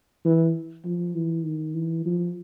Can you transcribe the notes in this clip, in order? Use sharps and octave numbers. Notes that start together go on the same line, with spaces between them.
E3
F3
E3
D#3
E3
F3